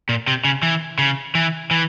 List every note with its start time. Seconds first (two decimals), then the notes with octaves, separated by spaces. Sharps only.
0.09 A#2
0.27 C3
0.44 C#3
0.63 E3
0.98 C#3
1.35 E3
1.71 E3